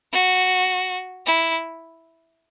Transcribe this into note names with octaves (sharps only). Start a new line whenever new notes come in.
F#4
E4